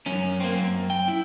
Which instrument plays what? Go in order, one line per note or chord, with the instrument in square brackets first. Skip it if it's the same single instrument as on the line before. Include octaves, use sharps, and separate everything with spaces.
[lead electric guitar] F#2 C#4
A#3 C4
F#2
G5
E4